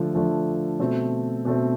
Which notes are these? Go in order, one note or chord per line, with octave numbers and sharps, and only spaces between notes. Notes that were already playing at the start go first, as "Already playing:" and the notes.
Already playing: D3 F3 A3
D3 F3 A3
B2 A3 C4
B2 A3 C4